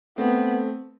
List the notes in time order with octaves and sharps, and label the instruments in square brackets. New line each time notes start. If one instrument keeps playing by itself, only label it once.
[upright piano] A3 C4 [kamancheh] B3